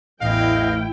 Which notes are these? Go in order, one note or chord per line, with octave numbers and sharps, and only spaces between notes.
A1 E2 E3 E4 D#5 F5 G5